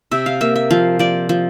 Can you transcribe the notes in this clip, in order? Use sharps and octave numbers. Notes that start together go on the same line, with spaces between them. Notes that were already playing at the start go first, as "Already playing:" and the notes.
C3 E5
F5
A#3 E5
E5
F3 F5
F3 D5
F3